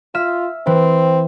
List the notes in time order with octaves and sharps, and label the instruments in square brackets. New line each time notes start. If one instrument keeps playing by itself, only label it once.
[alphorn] F4 [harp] E5 F6 E7
[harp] E3 [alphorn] C4